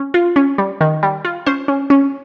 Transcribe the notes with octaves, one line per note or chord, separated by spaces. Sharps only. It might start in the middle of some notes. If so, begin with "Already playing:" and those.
Already playing: C#4
F4
C#4
G3
D#3
G3
F4
C#4 C5
C#4
C#4